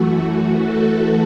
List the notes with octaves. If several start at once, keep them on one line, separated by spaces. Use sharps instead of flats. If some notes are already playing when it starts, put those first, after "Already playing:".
Already playing: F#2 E3 A3 F#4
F#4
A4